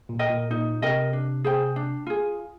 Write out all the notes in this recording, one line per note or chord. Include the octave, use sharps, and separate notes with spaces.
A#2
A#4 D#5 G5
A#2
A#2 D#4
C3 A#4 D#5 G5
D4
G#4 C5 G5
D4
F4 G#4